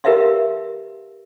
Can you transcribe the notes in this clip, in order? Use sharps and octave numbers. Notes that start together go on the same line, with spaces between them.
G4 A#4 B4 E5 F5 C6